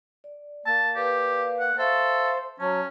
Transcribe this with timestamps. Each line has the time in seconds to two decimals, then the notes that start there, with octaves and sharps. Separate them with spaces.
0.24 D5
0.66 A#3 A5
0.96 G4 B4 D5 F5
1.60 F#5
1.78 A4 C5 E5 F5 C#6
2.60 F#3 C#4 A5